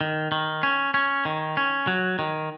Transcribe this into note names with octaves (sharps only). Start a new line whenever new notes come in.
D#3
D#3
C#4
C#4
D#3
C#4
F#3
D#3